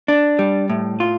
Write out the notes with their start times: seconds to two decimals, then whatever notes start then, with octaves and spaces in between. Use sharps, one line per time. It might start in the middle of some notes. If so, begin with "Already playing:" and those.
0.08 D4
0.39 G3
0.70 A2
1.00 F4